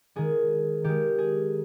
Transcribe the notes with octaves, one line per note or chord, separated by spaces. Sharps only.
D#3 G#3 G#4
D#3 G#3 G4
G#4